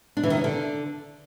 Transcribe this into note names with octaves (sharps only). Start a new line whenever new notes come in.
D4
E3
D#3
C#4
D3